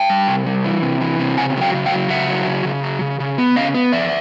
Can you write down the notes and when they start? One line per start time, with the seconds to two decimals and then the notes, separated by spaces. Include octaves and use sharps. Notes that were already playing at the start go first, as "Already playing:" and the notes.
Already playing: G5 A5
0.10 G3
0.28 C3
0.46 G3
0.64 E3
0.83 C3
1.01 E3
1.19 C3
1.37 C#3 F#5 G#5
1.56 F#3
1.61 F5 G5
1.74 C#3
1.86 F5 G5
1.92 F#3
2.10 C#3 E5 F#5
2.28 F#3
2.47 C#3
2.65 C#3
2.83 F#3
3.01 C#3
3.20 C#3
3.38 B3
3.56 C#3 D#5 F5
3.74 B3
3.92 F2 D5 E5